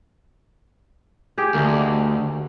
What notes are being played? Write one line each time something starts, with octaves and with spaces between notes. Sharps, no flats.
G4 G#4
D2 A#3 D#5